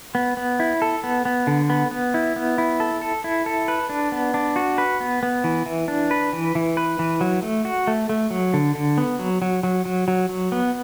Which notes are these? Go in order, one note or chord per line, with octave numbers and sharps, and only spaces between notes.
B3
B3
E4
A4
B3
B3
D3
B3
B3
E4
B3
E4
A4
A4
E4
A4
B4
D4
B3
D4
F#4
B4
B3
B3
E3
E3
D4
B4
E3
E3
B4
E3
F#3
A3
F#4
A3
A3
F#3
D3
D3
B3
F#3
F#3
F#3
F#3
F#3
F#3
B3